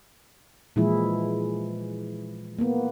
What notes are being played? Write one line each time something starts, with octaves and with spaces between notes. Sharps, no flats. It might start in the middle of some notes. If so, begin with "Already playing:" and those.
A#2 E3 F3 G#3 E4 G#4
A#3 B3